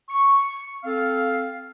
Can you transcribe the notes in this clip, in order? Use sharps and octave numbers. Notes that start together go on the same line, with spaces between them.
C#6
C4 A4 F5